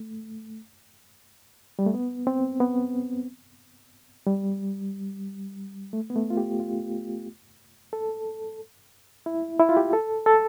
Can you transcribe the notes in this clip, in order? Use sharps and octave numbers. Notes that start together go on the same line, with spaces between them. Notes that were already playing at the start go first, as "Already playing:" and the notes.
Already playing: A3
G3
A3
B3
C4
B3
G3
A3
B3
A3
F4
G4
F4
A4
E4
E4
F4
G4
A4
A4